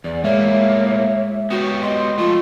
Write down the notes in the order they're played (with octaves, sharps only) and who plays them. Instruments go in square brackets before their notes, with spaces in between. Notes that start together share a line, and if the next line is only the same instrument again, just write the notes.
[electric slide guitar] E2 [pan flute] D5
[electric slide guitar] A2 A#3 [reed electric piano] G#3 [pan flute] C#5 [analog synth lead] E5
[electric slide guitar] B3 G4 C#5 [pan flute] F#4
[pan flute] D#5 [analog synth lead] C6
[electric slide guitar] F3 A3 [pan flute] F4